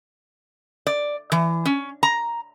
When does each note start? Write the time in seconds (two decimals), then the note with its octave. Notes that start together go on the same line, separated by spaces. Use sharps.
0.87 D5
1.32 E3
1.66 C#4
2.03 A#5